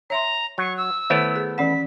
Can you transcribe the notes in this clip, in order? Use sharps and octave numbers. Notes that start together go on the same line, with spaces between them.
C#5 E5 A#5 C6
F#3 C#6
E6
D#3 A3 B3 E4 C#5
G#4
E3 C#4 F#5 B6